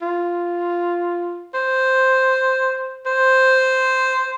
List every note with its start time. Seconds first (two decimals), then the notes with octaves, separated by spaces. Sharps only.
0.02 F4
1.54 C5
3.06 C5